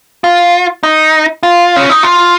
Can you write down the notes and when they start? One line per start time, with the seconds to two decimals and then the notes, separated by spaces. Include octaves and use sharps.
0.24 F4
0.83 D#4
1.43 F4
1.76 C#4
1.89 D#4
2.03 F4